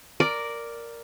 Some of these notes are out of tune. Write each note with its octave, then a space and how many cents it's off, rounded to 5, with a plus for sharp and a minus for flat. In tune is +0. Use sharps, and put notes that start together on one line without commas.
A#4 +0 D5 +0